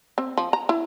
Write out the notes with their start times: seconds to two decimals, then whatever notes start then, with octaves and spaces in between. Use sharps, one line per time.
0.18 C4
0.37 F3
0.53 A#5
0.69 E4